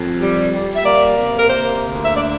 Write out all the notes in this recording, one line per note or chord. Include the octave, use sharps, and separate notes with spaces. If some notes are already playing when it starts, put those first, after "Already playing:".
Already playing: F2
G3
G3
E5
A#3 D5
C3
A#4
A#3 C5
D2
E5
D4 D5